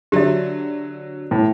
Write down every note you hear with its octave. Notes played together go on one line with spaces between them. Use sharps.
D3 F#3 G4 E5
A2